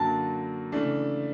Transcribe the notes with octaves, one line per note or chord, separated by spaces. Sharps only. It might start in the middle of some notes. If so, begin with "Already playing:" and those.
Already playing: F#2 D3 F#3 A#3 A5
C#3 E3 A3 D4